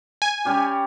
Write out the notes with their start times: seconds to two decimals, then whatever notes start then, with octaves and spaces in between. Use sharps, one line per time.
0.22 G#5
0.45 G3 C#4 G4